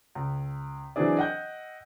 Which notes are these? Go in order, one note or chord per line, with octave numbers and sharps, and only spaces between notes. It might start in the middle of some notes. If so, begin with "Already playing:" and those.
C#2
E3 F#3 C4 D4 G#4 D5
D#5 F#5 G5 G6